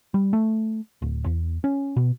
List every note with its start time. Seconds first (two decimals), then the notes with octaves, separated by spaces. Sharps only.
0.14 G3
0.33 A3
1.02 D1
1.26 E2
1.64 C#4
1.97 B2